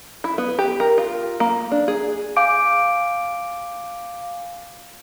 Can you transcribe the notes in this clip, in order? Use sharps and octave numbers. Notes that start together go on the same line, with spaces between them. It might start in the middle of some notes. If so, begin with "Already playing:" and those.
E4
B3
G4
A#4
F4
A#3
D4
G#4
F5 G#5 D6 G6 D7